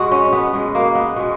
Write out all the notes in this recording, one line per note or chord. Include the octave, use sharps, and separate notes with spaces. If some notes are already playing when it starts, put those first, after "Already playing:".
Already playing: B2 G#3 F#4
C#4
B3
B2 G#3
A#3
B3
B2 G#3